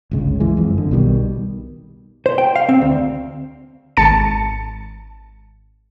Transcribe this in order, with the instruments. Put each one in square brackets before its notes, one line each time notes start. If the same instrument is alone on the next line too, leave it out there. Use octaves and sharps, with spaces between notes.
[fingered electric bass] G1 C#2 C#3
E3 G#3
F#1 F2
D3
B1 B2 D#3 G3
[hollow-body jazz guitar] C5
G5
F5
C4
D2
[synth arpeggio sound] G#1 A5 A6 C#7